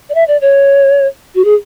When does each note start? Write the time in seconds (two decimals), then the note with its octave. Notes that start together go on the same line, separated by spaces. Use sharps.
0.09 D5
0.15 E5
0.28 D5
0.41 C#5
1.35 F#4
1.44 G#4